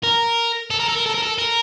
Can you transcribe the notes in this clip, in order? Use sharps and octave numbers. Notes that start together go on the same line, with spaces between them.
A#4
A4
A#4
A4
A#4
A4
A#4
A4
A#4